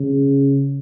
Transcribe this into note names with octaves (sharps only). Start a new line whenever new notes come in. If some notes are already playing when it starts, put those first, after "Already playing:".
Already playing: C#3